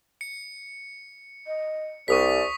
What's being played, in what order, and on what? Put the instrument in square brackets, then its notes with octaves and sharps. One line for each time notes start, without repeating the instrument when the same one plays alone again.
[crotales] C#7
[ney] D#5
[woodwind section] C2 [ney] D5 [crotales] C#6 D#6 B6